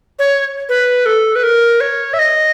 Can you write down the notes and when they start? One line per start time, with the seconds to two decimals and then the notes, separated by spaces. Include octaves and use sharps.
0.19 C#5
0.69 B4
1.06 A4
1.36 B4
1.43 A#4
1.81 C#5
2.14 E5
2.19 D#5